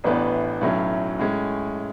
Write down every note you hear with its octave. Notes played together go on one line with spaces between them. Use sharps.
A1 A2 E3 B3 D4
B1 A2 F#3 C#4 E4
A2 G#3 C#4